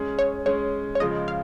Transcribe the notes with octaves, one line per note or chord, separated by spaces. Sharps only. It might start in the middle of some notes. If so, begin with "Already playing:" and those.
Already playing: G#3 C#4 G#4
C#5
G#3 C#4 G#4 C#5
C#5
C#3 F3 G#3 D#5
F5